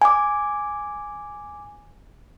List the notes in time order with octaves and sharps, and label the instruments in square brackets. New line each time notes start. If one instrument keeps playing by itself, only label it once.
[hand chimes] G#5 D6